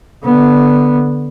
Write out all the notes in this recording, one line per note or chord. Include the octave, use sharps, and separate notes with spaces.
D3 B3